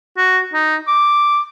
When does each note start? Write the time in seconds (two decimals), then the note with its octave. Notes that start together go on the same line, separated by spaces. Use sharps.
0.17 F#4
0.54 D#4
0.88 D6